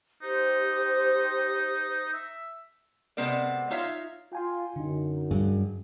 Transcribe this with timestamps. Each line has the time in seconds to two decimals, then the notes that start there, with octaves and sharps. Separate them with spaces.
0.22 D#4 G4 C5
2.13 E5
3.17 C3 G#3 B3 C4 A#4 D5
3.70 D#4 F4 C#5 E5 F5
4.33 F4 G5 G#5 C6
4.76 F#2 D3 D#4
5.31 G2 F#3 G#4